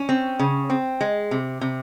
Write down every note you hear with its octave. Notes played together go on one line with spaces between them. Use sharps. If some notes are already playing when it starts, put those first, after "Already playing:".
Already playing: C#4
C4
C#3
C4
G#3
C3
C3